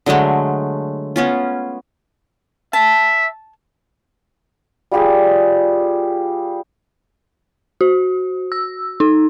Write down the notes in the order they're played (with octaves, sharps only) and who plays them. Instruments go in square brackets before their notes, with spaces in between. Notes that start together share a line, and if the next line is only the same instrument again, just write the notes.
[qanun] D3 F#3 G#3 A3
B3 C#4 F4
[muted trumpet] E5 [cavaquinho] A5
[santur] G3 F4 G4 G#4
[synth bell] F#4
E6
D#4